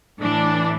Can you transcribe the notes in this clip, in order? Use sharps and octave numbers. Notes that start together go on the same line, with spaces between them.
A2 E3 D4